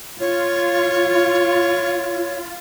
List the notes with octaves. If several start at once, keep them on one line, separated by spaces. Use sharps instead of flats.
F4 C#5